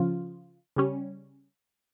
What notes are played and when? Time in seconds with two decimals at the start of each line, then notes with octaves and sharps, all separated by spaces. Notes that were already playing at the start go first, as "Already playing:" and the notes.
Already playing: C#3 F3 F4
0.76 C#3 G3 C#4